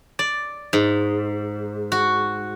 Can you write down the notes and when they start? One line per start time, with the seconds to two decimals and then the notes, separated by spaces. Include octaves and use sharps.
0.19 D5
0.73 G#2
1.92 F#4